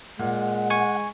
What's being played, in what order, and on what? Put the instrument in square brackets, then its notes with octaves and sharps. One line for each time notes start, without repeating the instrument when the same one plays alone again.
[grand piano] A#2 [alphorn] G#3 [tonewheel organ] F#5
[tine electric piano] G#5 C#6